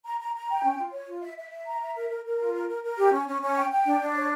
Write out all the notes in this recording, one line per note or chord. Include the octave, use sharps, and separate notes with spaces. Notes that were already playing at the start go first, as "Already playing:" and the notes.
A#5
A#5
A#5
G5
C#4
F4
C#5
F4
E5
E5
E5
A#5
E5
A#4
A#4
A#4
F4
A#4
A#4
A#4
G4
C#4
C#4
C#4
G5
G5
D4
D4
C#5